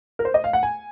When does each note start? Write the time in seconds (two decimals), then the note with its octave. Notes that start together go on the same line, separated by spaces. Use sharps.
0.19 A#4
0.25 C5
0.34 D#5
0.44 F5
0.53 F#5
0.63 G#5